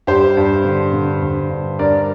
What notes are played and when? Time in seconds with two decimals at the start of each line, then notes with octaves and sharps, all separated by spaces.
0.07 G2 G4 C5
0.37 G2
0.64 D3
0.94 D3
1.22 G2
1.50 G2
1.79 G2 A#4 D5